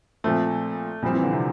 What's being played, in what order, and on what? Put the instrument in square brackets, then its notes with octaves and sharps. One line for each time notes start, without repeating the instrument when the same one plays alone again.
[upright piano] A#2 F3 C4 [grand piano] A3
[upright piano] A#2 F3 C4 [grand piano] G3
[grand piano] E3
D3
C3